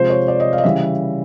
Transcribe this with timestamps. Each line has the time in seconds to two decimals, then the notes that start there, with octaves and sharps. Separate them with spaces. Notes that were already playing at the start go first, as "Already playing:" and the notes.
Already playing: C3 F3 G#3 C5
0.10 C#5
0.28 D5
0.40 D#5
0.53 F5
0.58 D#5
0.64 C#3 E3 G3 E5